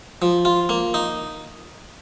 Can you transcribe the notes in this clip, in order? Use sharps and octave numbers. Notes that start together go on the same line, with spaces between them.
F3
F4
A#3
D#4